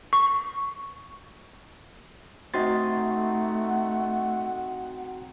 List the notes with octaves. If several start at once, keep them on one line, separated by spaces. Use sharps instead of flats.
C#6
C3 A3 D#4 F#4 F#5 C6 A6